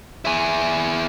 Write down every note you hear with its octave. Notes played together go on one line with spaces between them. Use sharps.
E4 G#4